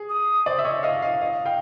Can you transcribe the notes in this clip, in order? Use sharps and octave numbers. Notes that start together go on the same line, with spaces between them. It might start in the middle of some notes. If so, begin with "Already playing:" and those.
Already playing: G#4
D#6
C5 D5
E5
C#5 D#5
D#5 F5
D#5 F5
D#5 F5
F5 G5